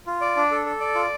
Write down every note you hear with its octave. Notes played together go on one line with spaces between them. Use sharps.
F4
D5
D4
A4
A4
D5
F4